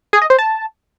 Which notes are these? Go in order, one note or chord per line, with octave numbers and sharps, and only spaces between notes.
G#4
D#5
C5
A5